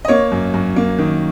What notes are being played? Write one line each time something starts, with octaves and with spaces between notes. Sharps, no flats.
D#5
A#3 C#5
F#2
F#2
A#3
D#3